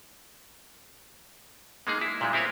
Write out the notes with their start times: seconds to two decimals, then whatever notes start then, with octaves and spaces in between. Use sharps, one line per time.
1.87 G#3 A#3 D#4 G#4
2.01 E4
2.21 A#2 G3 G#3
2.33 C4 E4 A#4 B4 C#5